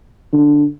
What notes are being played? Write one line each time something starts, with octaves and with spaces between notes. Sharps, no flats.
D3